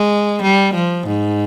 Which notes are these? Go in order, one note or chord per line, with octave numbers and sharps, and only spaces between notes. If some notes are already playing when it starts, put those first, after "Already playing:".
Already playing: G#3
G3
F3
G#2